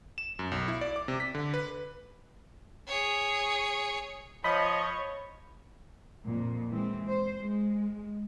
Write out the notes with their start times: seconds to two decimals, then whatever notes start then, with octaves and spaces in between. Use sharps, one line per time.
0.18 E7
0.39 F#2
0.52 B1
0.68 E4
0.81 D5
0.96 D6
1.08 C3
1.20 B6
1.35 D3
1.54 B4
2.88 G#4 C#5
4.44 F3 C#5 D#5 B5
6.24 F2 A#2
6.70 E3 G#3 C4
7.08 C5
7.38 G#3